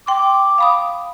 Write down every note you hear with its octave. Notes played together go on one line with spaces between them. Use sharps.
G5 C6 D6
F5 B5 D#6